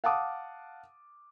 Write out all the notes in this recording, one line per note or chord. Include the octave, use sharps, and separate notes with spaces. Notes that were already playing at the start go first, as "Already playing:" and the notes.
F5 F#5 A5 D6 D#6